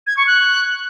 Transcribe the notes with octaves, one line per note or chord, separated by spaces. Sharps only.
G#6
C#6
F#6